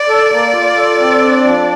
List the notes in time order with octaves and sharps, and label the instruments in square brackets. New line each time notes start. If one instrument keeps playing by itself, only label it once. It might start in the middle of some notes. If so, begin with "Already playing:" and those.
Already playing: [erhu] D5
[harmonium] A4
A#3
F4
A4
C4
D4
F3